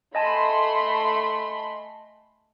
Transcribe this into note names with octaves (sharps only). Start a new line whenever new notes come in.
A3 D#5 G#5 A5 B5 C6